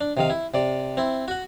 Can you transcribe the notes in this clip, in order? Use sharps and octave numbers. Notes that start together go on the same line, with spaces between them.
D4
C3 D#3 F5
E4
C3 D5
C4 E4
F#4 F#5